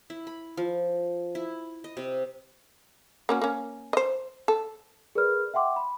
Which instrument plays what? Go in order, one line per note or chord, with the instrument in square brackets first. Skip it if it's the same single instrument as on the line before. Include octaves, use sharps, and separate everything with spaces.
[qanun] E4
B5
F3
E4
D#5
C3
[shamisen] A#3 C#4 F#4
A#3 C#4
C5 D#5
A4
[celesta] G#4 A#4 B4 D5 B5 F6
E5 F#5 G5 C6 D6
B5